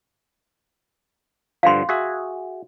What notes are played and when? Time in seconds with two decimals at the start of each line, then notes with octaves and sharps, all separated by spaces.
1.63 G2 D3 F3 F5 C6
1.89 F#4 G#4 E5